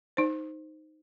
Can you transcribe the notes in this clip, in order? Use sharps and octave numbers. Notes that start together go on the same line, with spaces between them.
D#4 C5